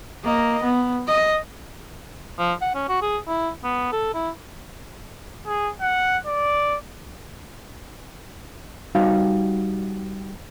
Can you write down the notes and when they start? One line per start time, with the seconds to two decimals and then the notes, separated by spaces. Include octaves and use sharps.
0.24 A#3 D#5
0.63 B3
1.08 D#5
2.39 F3
2.62 F#5
2.74 C#4
2.89 F#4
3.02 G#4
3.27 E4
3.64 B3
3.92 A4
4.14 E4
5.47 G#4
5.81 F#5
6.26 D5
8.95 G3 D#4 F#4 F5